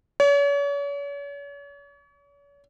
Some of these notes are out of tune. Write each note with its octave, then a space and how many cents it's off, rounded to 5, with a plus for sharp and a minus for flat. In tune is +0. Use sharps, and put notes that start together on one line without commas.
C#5 +40